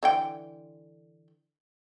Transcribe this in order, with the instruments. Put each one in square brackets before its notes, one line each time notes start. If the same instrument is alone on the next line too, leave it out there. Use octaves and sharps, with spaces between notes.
[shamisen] D3 E3 G5